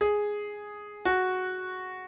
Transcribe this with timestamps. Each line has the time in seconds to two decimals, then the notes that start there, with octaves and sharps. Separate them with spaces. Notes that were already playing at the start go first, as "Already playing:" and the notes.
0.01 G#4
1.05 F#4